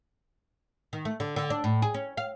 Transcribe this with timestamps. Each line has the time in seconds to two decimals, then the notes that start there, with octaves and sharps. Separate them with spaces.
0.93 D#3
1.05 A3
1.20 D3
1.36 D3
1.50 D4
1.64 A2
1.82 G#4
1.94 C#4
2.17 F5